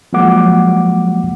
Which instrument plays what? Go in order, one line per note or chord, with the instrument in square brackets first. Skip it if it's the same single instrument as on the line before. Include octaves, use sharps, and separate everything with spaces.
[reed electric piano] F3 F#3 G#3 A#3 F#5 D6